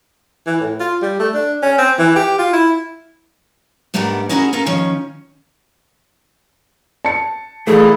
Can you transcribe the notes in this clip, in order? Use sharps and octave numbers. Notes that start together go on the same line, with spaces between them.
E3
A2
F4
G3
A3
D4
C#4
C4
E3
G4
F4
E4
G#2 A3 B3 D4 G4 A#4
C#4 D#4 E4 F#4 G#4 A#4
C#4 F4 A4 A#4
D#3 F3 C#4
A5 C#7
A#2 E3 A3 G#4